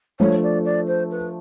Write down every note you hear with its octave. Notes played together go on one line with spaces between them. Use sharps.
F3 A3 D4 F4 C#5
D5
D5
C5
B4